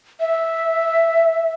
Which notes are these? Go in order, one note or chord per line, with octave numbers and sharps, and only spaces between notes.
E5